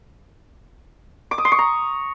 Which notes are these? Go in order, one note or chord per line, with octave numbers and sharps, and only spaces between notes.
D6
D#6
C6
C#6
A#5